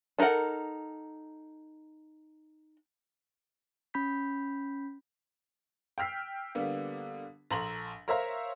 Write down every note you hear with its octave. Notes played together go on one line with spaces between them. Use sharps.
D4 D#4 A4 A#4 F#5
C#4 B5 G6 B6
G5 E6 F6 B6 C7
D3 G3 A#3 B3
A#1 A4 A#5 C6 F#7
A#4 C5 C#5 E5 F5 A#5